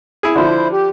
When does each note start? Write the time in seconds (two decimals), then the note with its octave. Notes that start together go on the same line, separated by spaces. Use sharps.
0.23 E4 G#4
0.36 D3 F3 E4 C5
0.73 G4